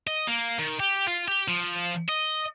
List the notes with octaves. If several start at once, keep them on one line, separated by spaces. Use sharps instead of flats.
D#5
A#3
D#3
G4
F4
G4
F3
D#5